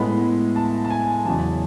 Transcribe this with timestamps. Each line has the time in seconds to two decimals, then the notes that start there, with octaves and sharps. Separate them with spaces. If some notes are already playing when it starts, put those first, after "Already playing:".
Already playing: A2 G#3 B3 B5
0.56 A5
0.85 A5
0.90 G#5
1.25 E2 C#3 F#3 A5